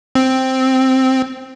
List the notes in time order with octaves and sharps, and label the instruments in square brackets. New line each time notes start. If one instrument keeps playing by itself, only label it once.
[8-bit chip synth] C4